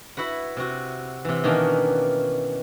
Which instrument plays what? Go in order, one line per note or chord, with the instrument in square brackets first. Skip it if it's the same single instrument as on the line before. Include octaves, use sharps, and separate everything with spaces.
[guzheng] E4 F#4 B4 F#5
C3 F#4
C3 E3
B2 D#3 E3 A#3 C#4 D4